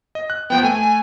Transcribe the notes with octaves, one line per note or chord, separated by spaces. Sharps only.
D#5
F#6
F2 F3 B3 G5
A3 G#5